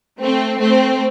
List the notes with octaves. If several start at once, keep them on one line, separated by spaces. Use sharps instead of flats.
A3 C4
A3 C4